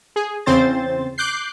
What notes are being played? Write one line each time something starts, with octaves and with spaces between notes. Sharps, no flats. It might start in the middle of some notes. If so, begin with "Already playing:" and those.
G#4
E2 C#3 C4 C5 A6
D6 F#6 G6 C7